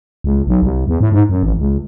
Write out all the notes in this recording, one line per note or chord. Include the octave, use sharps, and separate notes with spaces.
C#2
B1
C2
E2
A2
G#2
F#2
A1
C#2